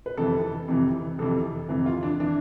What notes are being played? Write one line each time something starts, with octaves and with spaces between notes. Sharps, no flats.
B4
F2 C3 E3 A4
F2 C3 E3
F2 C3 E3 A4
F2 C3 E3
F4
D4
E3 D4